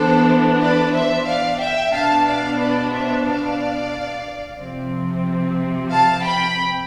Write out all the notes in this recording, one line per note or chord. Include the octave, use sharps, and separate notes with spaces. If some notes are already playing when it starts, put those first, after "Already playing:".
Already playing: E3 B3 D4 A4 C5
B4 D5
C5 E5
D5 F5
E5 G5
B2 B3 D4 F5 A5
D5 F5
B4 D5
C5 E5
D5 F5
C3 F3 C4
F5 A5
G5 B5